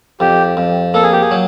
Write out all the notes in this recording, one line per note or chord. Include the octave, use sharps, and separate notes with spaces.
F2 G4
F2
A#3 A4
G#4
G4
G#4
F#3